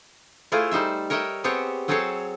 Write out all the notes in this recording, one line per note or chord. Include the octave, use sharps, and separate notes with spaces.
A3 E4 F4 G#4 C5
G3 D#4 C5 E5
A#4 C#5 D#5 E5 G5
B3 C4 G4 G#4 C5 C#5
F#3 C4 G#4 A4 C5 C#5